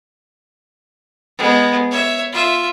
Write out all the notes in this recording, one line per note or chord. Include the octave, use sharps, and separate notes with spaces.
G#3 B3
C#5 E5
F4 E5